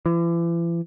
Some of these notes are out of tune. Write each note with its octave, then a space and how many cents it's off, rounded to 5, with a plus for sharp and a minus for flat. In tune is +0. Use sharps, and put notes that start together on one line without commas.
E3 +40